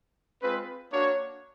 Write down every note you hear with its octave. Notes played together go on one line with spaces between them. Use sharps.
G#3 C4 F4 B4
A#3 D4 F#4 C#5